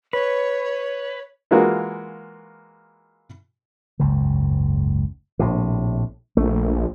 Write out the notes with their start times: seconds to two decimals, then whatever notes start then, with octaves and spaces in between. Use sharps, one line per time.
0.13 B4 C#5
1.51 E3 G#3 A#3 F4 F#4 A#4
4.00 F#1 C#2 G#2 C#3
5.39 A#1 A2 C3
6.37 A#1 A3